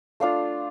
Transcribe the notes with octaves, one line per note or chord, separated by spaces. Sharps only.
A3 D4 F4 F5